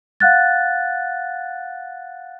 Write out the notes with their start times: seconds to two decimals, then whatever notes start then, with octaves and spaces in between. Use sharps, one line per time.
0.20 F5 F#5 F#6 A6